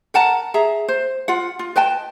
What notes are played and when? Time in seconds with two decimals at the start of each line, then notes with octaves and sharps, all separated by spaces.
0.14 A#4 F#5 A5 A#5
0.54 G#4 E5 A#5
0.88 C5
1.28 F4 F#5
1.59 F4
1.76 B4 D#5 G5 A5